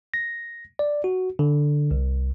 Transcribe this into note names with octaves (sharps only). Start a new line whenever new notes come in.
A#6
D5
F#4
D3
C2